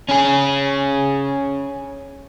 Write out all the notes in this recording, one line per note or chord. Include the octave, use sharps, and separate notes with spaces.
C#4 G#4